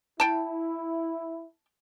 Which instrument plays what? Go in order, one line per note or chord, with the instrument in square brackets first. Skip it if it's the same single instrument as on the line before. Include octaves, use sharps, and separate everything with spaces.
[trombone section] E4 [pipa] G5 A5